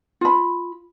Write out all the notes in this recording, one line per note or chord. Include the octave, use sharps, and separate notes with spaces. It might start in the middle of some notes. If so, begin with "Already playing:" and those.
F4 B5